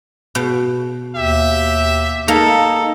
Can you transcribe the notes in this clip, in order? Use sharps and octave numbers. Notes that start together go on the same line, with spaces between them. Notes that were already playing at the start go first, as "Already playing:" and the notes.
B2
D#2 G4 E5
A#3 D#4 A4